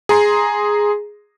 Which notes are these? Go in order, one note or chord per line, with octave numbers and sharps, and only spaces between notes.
G#4 A#5 C6